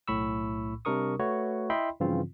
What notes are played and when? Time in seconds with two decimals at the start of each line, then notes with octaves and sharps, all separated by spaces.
0.08 B1 A2 B5 C#6 E6
0.85 C3 G3 D4 A#4 C#6 D#6
1.20 A3 F#4 B4 C#5
1.70 E4 D#5 E5 G5 B5 C6
2.00 G2 C#3 E3 F3 C4 F4